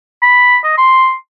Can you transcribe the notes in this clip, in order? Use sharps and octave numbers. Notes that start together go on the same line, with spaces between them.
B5
D#5
C6